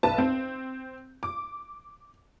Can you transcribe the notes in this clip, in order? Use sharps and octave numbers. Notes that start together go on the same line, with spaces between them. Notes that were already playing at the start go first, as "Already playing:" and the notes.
B1 B4 A5
C4
D6